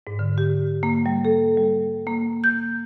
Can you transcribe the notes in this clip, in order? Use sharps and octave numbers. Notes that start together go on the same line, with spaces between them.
G#2
D3
G4
A#3
G3
A4
G3
A#3
G6